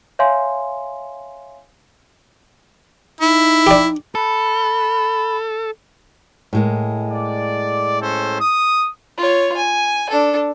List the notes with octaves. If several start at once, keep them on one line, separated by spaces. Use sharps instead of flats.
C#5 E5 F5 G#5 C6
D#4 E4
G4 D5
A4 B5
A2 G#3 A#3
D5
C#4 A4 C5
D#6
F4 C#5
G#5
D4 A4